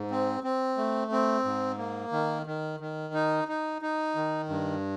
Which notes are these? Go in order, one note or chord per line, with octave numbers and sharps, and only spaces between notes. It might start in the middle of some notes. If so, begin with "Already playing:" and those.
Already playing: G#2
C4
C4
A3
C4
G#2
A#3
D#3
D#3
D#3
D#4
D#4
D#4
D#3
G2